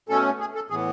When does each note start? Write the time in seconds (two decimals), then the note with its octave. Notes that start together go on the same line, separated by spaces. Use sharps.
0.09 B2 A3 C#4 A4
0.40 G#4
0.55 A4
0.70 A2 E3 B3 G#4